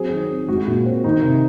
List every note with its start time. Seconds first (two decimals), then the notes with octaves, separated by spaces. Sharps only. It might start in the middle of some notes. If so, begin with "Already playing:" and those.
Already playing: F#3 C4 G#4
0.11 D#3
0.29 C4
0.48 G#3 F#4
0.67 A#2
0.86 C4
1.04 D#3 D#4
1.23 C3